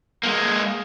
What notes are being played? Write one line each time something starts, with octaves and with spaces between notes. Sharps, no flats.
G#3 A#3